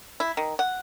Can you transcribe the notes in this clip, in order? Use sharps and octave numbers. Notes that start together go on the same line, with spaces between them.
E4
D#3
F#5